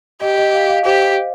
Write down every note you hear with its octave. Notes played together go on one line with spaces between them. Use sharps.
G4 D#5
D#5
F5
F5
G4 C5